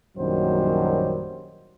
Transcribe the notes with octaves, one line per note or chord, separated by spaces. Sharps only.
A#1 F#2 D#3 F#3 G3 C5